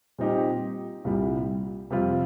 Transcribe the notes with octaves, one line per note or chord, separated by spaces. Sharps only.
A#2 G3 C4 D#4 G4
C2 A#2 G3
F2 C3 G3 C4 F4